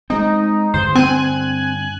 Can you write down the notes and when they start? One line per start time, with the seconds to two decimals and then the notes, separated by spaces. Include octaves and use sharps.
0.10 G#3 C4 D#4
0.74 G2 D3 C5
0.95 C4 G#5 F#6